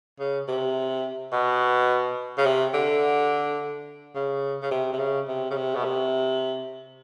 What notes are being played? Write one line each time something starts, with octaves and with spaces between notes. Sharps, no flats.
C#3
C3
B2
C#3
C3
D3
C#3
C#3
C3
C3
C#3
C3
C#3
C3
B2
C3